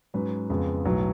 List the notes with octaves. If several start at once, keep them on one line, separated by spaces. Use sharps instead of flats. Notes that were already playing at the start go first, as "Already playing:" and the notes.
G#2 F#3 C#4 B4
F2 C#3 G#3 B3
B1 A2 F#3 B3